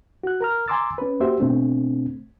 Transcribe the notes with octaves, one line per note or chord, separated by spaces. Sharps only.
F#4 F#6
A#4 A#5 F6
G#5 A#5 C6 D6 E6 A6
C#4 B4
A#3 F#4 G4 C5 E5
B2 A3 C4 D4